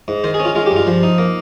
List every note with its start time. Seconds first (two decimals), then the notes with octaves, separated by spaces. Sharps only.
0.08 G#2
0.24 D#3 C5
0.34 G#4
0.40 C#4
0.45 F4
0.55 G#3 F4
0.66 G4
0.71 G2
0.76 F4
0.87 F3
1.03 D#4
1.18 A#3